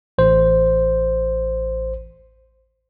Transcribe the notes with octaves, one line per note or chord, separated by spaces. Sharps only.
A1 C5